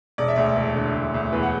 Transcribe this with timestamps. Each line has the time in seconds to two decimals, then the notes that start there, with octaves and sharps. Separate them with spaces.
0.18 E1 D5
0.28 E5
0.36 D2 D5
0.56 E1
0.75 D3
0.94 E1
1.14 D2
1.32 E2 B4
1.43 F#5